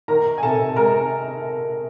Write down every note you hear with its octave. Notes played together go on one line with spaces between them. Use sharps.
D#3 A#4 A#5
G#5
C3 A4 A5
G#3 A#4 A#5